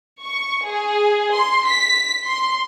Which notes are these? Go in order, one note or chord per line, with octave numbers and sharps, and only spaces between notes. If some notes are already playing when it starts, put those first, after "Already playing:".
C#6
G#4
C6
B6
C6